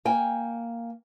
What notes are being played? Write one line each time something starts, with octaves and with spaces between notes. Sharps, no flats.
A#3 G5 G#5